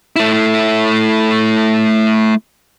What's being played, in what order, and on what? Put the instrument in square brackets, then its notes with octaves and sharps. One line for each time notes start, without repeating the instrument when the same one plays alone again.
[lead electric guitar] A3 E4